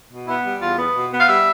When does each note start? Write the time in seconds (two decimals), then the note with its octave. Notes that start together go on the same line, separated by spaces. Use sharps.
0.10 B2
0.27 B3 E4
0.44 G3
0.61 E2 F4
0.78 B3
0.94 B2
1.11 B3
1.20 F5
1.28 G3 E5